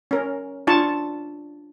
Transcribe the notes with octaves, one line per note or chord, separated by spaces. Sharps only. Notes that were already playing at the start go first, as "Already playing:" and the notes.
C#4 A#4
D4 F4 A5 C#6